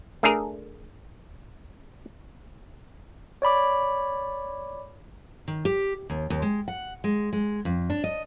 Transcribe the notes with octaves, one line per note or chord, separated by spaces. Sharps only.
A3 D4 G#4 A#4
C#5 D5 B5 D6
D#3
G4
D#2
D#2
G#3
F#5
G#3
G#3
F2
D4
D#5